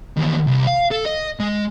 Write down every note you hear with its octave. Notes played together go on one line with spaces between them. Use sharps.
E2 D#3
C2
F5
A4
D#5
G#3